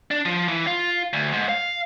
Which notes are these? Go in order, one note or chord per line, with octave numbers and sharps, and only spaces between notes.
D4
F3
E3
F4
D2
G#2
F5